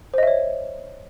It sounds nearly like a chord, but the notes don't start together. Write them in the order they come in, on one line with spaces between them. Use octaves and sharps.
C5 D#5 E5 C#5